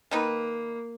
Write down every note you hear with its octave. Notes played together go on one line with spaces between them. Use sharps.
D#3 A#3 D#4 B4